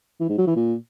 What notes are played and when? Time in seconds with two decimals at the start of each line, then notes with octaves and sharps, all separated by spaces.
0.20 E3
0.29 G#2
0.38 F#3
0.47 E3
0.56 A#2